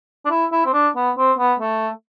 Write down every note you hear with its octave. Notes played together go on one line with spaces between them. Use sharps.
D4
E4
E4
C4
D4
B3
C4
B3
A3